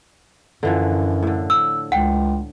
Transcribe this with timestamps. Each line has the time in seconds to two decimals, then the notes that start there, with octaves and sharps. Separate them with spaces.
0.63 F#2 D3 E3 F3
1.23 A2 D3
1.50 E6
1.92 C#2 F#5 G5